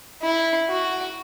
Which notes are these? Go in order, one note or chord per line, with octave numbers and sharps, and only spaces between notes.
E4
F#4